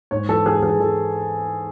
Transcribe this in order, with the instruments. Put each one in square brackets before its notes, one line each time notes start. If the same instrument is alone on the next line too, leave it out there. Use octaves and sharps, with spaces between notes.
[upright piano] G#2 C#5
E3 A4
E3 G#4
A4
E3 G#4
E3 A4